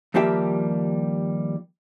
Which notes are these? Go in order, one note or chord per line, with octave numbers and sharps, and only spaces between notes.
D#2 F3 G3 A#3 G4 E5